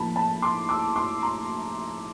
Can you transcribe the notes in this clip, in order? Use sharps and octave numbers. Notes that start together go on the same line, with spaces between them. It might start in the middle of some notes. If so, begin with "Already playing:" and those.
Already playing: A2 F3 A#3 A5 B5
A5 B5
C6 D6
D6 E6
C6 D6
A#5 C6